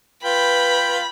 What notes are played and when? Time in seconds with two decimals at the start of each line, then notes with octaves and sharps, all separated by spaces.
0.24 F4 B4 G5 B5